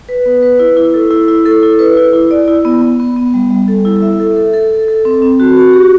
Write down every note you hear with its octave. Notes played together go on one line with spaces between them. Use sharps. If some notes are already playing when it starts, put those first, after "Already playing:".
B4
B3
B4
E4
E4
A4
E4
E4
A4
E4
B4
E4
E4
D5
E4
B3
B3
B3
B3
G3
G3
A4
E4
E5
A4
A4
A4
A4
A4
C4
C4
F#4
F#4
G4